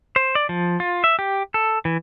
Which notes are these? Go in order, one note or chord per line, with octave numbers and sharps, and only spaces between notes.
C5
D5
F3
F4
E5
G4
A4
E3